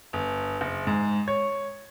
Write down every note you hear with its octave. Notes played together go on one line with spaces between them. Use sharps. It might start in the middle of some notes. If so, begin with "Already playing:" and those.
G1
F#1
G#2
C#5